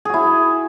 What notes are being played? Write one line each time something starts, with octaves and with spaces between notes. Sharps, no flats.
E4 F#4 G#4